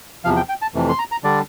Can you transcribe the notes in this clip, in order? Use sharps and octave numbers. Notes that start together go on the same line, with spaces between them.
E2 C3 F3 F5
G5
G5
A5
F2 C3 E3 A3
C6
A#5
A#5
D3 G3 D4 D5